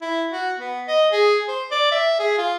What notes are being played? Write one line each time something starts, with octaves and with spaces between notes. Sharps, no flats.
E4
F#4
B3
D#5
G#4
C5
D5
E5
G#4
F4